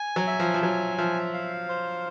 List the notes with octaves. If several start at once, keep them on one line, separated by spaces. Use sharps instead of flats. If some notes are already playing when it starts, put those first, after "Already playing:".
Already playing: G#5
F#3
E5
F3
F3
F#3 G#5
F3 E5
F5
C5